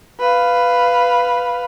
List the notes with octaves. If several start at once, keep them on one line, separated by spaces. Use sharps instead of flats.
B4 F5